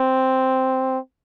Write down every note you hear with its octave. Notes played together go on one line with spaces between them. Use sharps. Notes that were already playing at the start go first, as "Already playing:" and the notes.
Already playing: C4